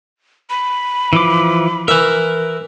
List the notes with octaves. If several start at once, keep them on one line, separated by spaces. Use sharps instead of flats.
B5
E3 F3 D6
E3 A#4 E5